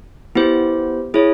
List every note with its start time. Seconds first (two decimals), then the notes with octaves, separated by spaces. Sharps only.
0.35 B3 E4 G4 C5
1.14 E4 G#4 C#5